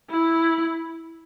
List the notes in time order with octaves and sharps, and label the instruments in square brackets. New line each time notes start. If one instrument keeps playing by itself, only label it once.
[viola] E4